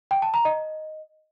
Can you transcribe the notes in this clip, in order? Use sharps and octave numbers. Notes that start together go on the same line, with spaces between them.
G5
A5
A#5
D#5